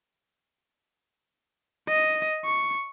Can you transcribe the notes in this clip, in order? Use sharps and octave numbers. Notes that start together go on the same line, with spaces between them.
D#5
C#6